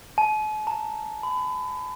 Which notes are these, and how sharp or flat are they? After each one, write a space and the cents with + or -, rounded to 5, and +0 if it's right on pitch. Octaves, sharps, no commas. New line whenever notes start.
A5 -45
A#5 -40
B5 +30